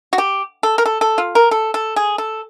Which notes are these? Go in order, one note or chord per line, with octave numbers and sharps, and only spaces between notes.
F#4
G4
A4
A#4
A4
A4
F4
A#4
A4
A4
G#4
A4